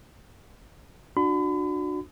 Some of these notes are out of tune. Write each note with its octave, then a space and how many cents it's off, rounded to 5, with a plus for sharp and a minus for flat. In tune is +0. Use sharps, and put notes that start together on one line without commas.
D4 +20 F#4 -25 B5 +40